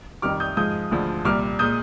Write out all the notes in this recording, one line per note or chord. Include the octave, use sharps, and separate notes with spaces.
F2 D#3 G3 D6 F6
D#6 G6
G#2 F3 G#3 D#6 G6
D2 D3 F3 G#3
C2 A#2 G3 D6 F6
A#2 G#3 D#6 G6